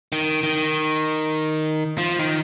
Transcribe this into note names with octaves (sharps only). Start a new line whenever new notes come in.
D#3
D#3
F3
D#3